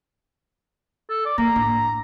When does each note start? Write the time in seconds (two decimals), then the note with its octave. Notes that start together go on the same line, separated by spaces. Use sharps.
1.10 A4
1.25 D5
1.38 A#3 A#5
1.56 A2 D4